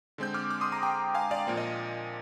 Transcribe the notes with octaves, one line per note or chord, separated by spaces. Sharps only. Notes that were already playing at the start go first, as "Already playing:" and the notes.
D3 G#3 C4 G6
D6 F6
D6 F6
C6 D#6
A#5 D6
G5 A#5
F5 G#5
D5 F5
A#2 F3 A#3
D#5